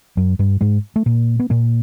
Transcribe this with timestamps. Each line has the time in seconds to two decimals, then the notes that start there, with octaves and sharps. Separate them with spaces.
0.17 F#2 F#3
0.39 G2 G3
0.61 G#2 G#3
0.96 A3
1.06 A#2 A#3
1.39 B3
1.50 A#2 A#3